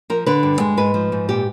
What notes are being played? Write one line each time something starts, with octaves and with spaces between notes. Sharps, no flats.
F3 A#4
D3 B4
G2
G#3
G#2 B4
F3
G#2
A#2 G4